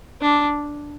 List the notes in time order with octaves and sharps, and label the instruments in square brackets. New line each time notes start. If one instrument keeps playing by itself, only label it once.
[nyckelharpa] D4